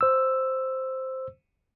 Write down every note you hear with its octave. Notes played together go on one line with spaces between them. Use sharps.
C5 E6